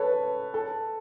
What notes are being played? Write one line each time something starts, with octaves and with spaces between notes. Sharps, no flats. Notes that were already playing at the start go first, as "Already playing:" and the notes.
Already playing: A4 B4 C#5
A4